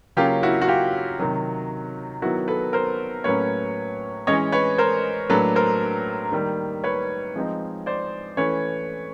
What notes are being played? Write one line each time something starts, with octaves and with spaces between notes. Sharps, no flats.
C#3 F#3 A#3 C#4 F4 G4
E4 F#4
F#4
F4 G4
C3 D#3 F#3
D#3 F#3 B3 E4 F#4
A4 B4
A#4 C5
A2 F#3 A#3 C#4 B4 C#5
E3 G#3 C#4 C#5 D#5
B4 C#5
A#4 C5
A2 F#3 A#3 D4 A4 B4
A#4 C5
D#3 G3 A#3
B4 C#5
F3 G#3 C4 D#4
C5 D5
E3 A3 C#4 B4 C#5